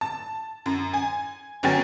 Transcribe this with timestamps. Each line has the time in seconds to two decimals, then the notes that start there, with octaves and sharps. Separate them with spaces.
0.01 A5
0.66 F#2
0.94 G#5
1.63 G1 F#3 C#4 G5 G#5 A6